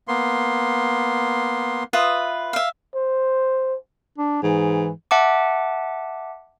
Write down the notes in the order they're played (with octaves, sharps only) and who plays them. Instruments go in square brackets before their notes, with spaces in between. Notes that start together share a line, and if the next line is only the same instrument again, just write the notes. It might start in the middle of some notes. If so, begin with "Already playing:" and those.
[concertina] A#3 B3 C6
[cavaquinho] F4 B4 E5 D#6
E5 F5
[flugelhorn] C5
[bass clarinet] D4
[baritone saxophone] G#2 [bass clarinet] E3
[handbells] E5 F#5 A5 D6